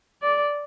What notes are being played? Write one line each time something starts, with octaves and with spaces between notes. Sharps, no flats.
D5